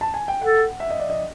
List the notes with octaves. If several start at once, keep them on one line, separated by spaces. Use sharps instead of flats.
A5
G#5
G5
A4 F#5
E5
D#5
D5
D#5